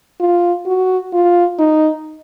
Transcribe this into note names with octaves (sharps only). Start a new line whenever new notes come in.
F4
F#4
F4
D#4